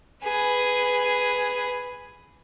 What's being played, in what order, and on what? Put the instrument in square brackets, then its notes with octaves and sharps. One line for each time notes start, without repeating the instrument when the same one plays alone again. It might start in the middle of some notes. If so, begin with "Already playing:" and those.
[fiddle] G#4 B4